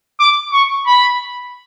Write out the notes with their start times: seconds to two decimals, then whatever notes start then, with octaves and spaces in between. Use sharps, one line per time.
0.20 D6
0.53 C#6
0.86 B5